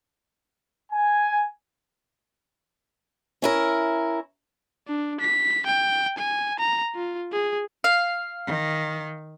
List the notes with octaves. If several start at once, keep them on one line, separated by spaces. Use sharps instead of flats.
G#5
C#4 E4 A#4
D4
B6
G5
G#5
A#5
F4
G#4
F5
D#3